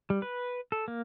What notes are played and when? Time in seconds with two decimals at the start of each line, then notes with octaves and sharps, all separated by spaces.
0.10 G3
0.22 B4
0.72 A4
0.88 A#3